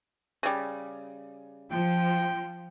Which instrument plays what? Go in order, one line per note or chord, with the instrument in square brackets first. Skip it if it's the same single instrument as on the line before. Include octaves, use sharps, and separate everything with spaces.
[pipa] C#3 G3
[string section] F3 [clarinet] G5